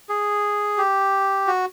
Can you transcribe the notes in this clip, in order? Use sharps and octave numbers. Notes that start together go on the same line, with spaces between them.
G#4
G4
F#4